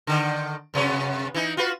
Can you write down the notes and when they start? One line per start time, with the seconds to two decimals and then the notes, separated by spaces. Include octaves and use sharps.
0.07 D3 D#3
0.74 F#2 C3 B3
1.34 E3 D#4
1.57 F4 F#4 B4